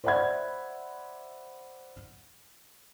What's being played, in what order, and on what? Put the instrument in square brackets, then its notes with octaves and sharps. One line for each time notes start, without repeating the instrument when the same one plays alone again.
[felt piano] C5 D5 E5 F#5 B5 G#6